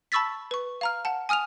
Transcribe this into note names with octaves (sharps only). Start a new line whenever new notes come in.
A5 B5 C#6 E6 A6 B6
B4 C#6
F5 A#5 F6
F#5 A5
G#5 D#6 F6 D#7 F7